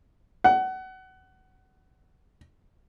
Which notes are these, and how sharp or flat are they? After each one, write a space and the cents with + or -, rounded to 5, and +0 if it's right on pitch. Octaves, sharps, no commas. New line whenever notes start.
F#5 +25